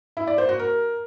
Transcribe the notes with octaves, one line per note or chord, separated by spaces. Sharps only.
E4
D5
C5
F#4
A#4